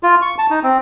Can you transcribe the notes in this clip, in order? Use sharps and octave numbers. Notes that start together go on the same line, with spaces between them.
F4
C#6
A5
D#4
C4